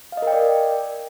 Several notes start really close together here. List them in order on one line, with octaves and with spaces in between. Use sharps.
F5 D#5 A#4 G5 D5